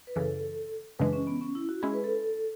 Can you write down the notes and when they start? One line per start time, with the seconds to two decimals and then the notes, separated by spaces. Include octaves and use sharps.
0.07 B4
0.15 F#2 C#3 E3 A4
0.99 F#2 C#3 E3 G#3 D4 B4
1.13 C#4
1.27 B3
1.41 C#4
1.55 E4
1.69 F#4
1.82 G#3 C#4 E4 G#4
1.94 B4
2.04 A4